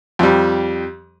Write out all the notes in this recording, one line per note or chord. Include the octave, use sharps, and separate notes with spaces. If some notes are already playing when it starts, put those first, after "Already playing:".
F2 G3